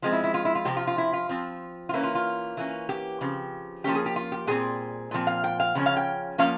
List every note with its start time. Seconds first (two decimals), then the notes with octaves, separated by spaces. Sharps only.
0.02 F3 G#3 C4
0.12 E4
0.24 E4
0.34 F4
0.45 E4
0.55 F4
0.65 C3 F3 C4 G4
0.77 F4
0.87 F4
0.98 E4
1.13 F4
1.29 F3 C4
1.89 F4
1.93 E3 A#3 C#4 E4
2.03 F4
2.15 F4
2.57 E3 A#3 C#4
2.89 G4
3.21 C#3 F3 C4
3.84 F3 A#3 C#4 G4
3.95 G#4
4.06 G4
4.16 F4
4.32 G4
4.47 A#2 G3 C4 G#4
5.11 A#2 F3 C4
5.27 F5
5.44 G5
5.60 F5
5.75 C#3 F3 C#4
5.86 F5
5.97 G5
6.38 F3 A#3 C#4 F5